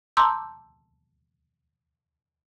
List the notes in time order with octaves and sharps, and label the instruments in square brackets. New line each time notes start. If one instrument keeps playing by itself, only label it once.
[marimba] A5 A#5 C6 D6 E6 G6